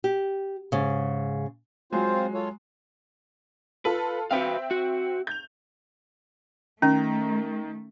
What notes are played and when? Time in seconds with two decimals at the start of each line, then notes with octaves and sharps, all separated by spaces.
0.04 G4
0.72 G#2 C#3
1.92 F#3 G#3 C4 F4 C5
2.34 F4 A4 C#5
3.85 F4 A4 B4
4.31 C4 F#4 B4 E5 F5 G5
4.71 F#4
5.27 G6 F7
6.82 D#3 A3 C#4 A#5